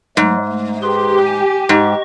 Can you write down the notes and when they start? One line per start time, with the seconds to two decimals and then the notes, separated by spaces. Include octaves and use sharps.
0.17 G#2 F#3 G#3 A3
0.48 A3
0.83 G4 G#4 B4 C6
1.26 G#5
1.69 G#2 D#5 C#6